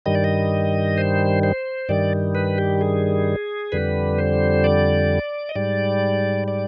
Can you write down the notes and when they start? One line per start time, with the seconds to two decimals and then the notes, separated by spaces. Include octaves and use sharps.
0.06 G2 D#3 G3 D#5
0.15 D5
0.24 D#5
0.98 C5
1.43 C5
1.89 G2 D#3 G3 D5
2.35 B4
2.58 G4
2.81 G#4
3.72 F2 D3 G3 B4
4.18 C5
4.64 D5
5.49 D#5
5.55 G#2 G3 D5
6.48 D5